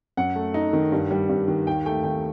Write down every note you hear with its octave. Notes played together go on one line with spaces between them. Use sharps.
F#2 F#5
A3
D#4
D#3
G2
G3
G2
D#3
D#2 G5
A3 G5
D#2 G5